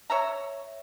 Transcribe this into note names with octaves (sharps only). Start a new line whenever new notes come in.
C#5 E5 A#5